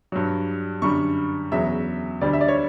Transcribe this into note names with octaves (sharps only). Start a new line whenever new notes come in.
G2 F#3
F#2 D3 G3 C#6
E2 C#3 F#3 E5
D2 D3 G3 D5
E5
D5
C#5